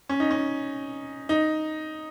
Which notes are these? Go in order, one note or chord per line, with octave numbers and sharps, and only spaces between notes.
C#4
D#4
C#4
D#4